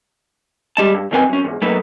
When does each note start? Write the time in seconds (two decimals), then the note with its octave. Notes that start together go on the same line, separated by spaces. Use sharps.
0.77 G3 G#3 A5
0.94 G2
1.11 B1 F#2 D#3 C4 B4 G#5
1.29 F#2 C#4
1.44 E2 G#2
1.62 F#3 A3 A#3 D#4 A4 B4